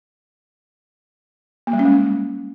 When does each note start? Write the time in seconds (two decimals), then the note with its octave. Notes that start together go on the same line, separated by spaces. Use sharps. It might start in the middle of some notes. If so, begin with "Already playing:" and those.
1.67 A#3
1.73 G3
1.79 C#4
1.85 G#3